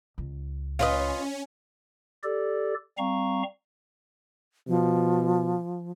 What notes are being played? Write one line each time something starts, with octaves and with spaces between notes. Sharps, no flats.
C#2
C#4 F4 B4 D#5
G4 A4 D5
G3 C4 F5 A#5 C#6
B2 F3